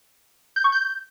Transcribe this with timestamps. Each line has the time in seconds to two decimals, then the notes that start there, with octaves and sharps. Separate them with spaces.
0.56 G6
0.64 C#6
0.72 G6